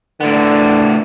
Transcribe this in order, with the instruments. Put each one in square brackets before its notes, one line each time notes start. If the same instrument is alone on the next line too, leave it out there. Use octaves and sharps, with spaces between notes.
[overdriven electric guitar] A2 B3 [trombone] D3